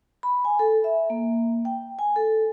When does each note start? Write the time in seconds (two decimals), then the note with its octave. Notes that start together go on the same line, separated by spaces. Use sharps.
0.23 B5
0.45 G#5
0.59 A4
0.84 E5
1.10 A#3
1.65 G5
1.99 G#5
2.16 A4